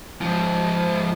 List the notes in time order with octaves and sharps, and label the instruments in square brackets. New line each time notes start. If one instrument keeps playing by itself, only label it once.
[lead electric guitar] G#2 F3